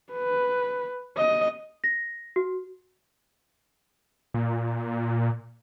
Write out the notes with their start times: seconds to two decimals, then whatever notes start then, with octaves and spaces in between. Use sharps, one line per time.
0.13 B4
1.18 D#5
1.84 A#6
2.36 F#4
4.34 A#2